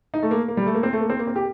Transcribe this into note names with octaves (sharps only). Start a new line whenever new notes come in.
D#4
A3
A#3
A#3
G3
A3
A#3
C4
A3
A#3
C4
A#3
C4
G4